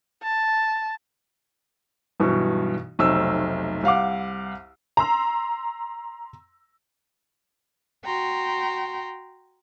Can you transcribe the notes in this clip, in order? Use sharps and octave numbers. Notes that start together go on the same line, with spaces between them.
A5
B1 G2 B2 E3 C#6
F1 B1 C3 A3 D#4 E6
C2 F5 F#5 D6
A#5 C6 E6
F#4 G5 A#5 C6